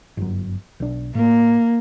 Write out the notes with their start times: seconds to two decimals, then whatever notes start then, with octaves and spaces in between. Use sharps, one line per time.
0.17 G1 F#2
0.80 B1 D4
1.15 A2 A#3